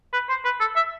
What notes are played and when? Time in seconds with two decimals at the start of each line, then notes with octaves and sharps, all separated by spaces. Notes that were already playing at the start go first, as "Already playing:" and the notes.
0.13 B4
0.29 C5
0.45 B4
0.60 A4
0.76 E5